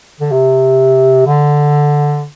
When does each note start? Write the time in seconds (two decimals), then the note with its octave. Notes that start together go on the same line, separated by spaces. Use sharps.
0.20 D3
0.32 C3
1.26 D3